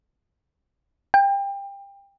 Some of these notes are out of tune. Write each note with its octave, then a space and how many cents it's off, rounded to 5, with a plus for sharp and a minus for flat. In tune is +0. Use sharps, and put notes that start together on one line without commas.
G5 +25